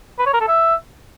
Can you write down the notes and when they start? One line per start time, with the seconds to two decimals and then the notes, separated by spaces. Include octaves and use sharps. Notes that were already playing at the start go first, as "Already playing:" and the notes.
0.19 B4
0.26 C#5
0.33 A#4
0.41 A4
0.48 E5